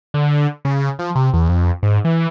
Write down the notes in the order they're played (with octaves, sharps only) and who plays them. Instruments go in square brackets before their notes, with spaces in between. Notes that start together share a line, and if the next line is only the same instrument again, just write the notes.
[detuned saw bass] D3
C#3
F3
C3
E2
F2
G#2
E3